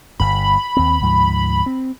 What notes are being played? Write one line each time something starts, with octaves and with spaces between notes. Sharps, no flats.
G1 G2 B5
D#2 C4
D2 G#2 F3
C4